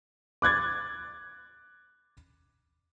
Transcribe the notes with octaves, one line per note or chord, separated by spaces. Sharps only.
D6 F#6 G#6 A6